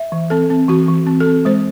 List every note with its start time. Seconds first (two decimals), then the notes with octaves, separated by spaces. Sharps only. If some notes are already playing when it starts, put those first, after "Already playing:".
Already playing: E5
0.12 E3
0.30 C4 A4
0.50 C4
0.69 E3 F#4
0.88 E3
1.07 C4
1.20 A4
1.26 C4
1.45 G#3 C5